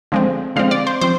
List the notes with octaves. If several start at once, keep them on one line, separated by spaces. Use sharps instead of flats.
D3 F3 G#3 C4
D3 F3 G#3 C4 F5
D5
C5
F3 C4 C5